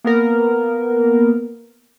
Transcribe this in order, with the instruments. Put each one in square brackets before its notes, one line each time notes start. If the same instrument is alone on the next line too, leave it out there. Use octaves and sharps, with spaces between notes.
[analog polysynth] A#3 B3 A#4